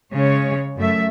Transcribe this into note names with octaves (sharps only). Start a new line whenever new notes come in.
C#3 G#3 C#5
F#2 A3 E5